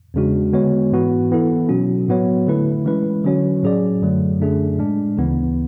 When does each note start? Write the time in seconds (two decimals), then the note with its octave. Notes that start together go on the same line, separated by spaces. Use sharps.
0.14 E2 C#3 G#3 D4 F#4
0.53 D3 G#3 B3 F#4 C#5
0.92 G#2 E3 B3 F#4
1.31 E3 B3 E4 A4
1.69 B2 F#3 C#4 F#4
2.08 A2 F#3 B3 F#4 C#5
2.47 D3 A3 E4 B4
2.85 E3 G#3 C#4 E4 B4
3.24 D3 F#3 C#4 F#4 C#5
3.63 A2 F#3 C#4 G#4 D5
4.02 F#2 D3 F#3 A3
4.40 F#2 D3 A3 D4 G#4
4.78 A2 G#3 D4
5.17 D2 C#3 E3 B3